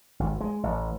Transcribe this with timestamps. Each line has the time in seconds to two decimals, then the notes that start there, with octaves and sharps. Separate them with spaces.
0.20 G#1
0.41 G#3
0.63 A1